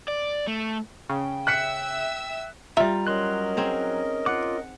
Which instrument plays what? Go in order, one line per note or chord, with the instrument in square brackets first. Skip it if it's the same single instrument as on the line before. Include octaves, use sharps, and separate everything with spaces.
[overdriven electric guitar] D5
A3
[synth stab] C#3 [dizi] G5
[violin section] E5 E6 [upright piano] F#6 B6 C#7
[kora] G3 F4 [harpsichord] E5 [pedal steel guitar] A#5
[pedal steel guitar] F#3 C6 F#6 [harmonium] C#4 A#4 D#5
[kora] C4 D#4 G#4
[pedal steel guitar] F4 D6 [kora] F#5